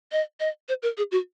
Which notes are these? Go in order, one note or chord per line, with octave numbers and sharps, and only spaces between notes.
D#5
D#5
C5
A#4
G#4
F#4